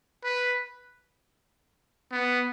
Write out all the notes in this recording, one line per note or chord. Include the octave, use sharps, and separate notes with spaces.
B4
B3